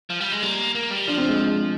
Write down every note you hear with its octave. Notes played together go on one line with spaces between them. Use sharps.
F3
G3
G#3
G3 A#3
A#3
G3
F3 D4
C4
G#3
G#3